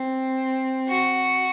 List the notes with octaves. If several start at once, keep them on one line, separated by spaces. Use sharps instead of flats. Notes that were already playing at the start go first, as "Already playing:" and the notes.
Already playing: C4
F#4